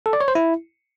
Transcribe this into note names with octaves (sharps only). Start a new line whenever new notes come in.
A4
D5
C#5
C5
E4